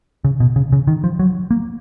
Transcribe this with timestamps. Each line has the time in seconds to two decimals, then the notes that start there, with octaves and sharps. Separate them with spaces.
0.24 C#3
0.40 B2
0.56 C#3
0.72 C#3
0.87 D#3
1.04 F3
1.19 F#3
1.51 A#3